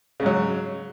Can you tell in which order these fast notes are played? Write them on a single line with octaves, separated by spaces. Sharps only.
C#3 G#2 F#3